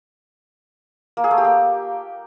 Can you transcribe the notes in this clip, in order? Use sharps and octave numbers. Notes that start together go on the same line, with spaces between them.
A#3
G#4
A3
G4
A#3